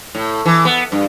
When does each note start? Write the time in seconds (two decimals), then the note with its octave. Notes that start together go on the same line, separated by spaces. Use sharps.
0.15 A2
0.46 E3
0.65 B3
0.92 G2